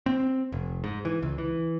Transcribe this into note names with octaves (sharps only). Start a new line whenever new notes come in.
C4
F1
G#2
E3
C#2
E3